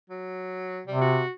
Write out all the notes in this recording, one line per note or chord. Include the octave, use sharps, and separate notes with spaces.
F#3
C3 G3
F#4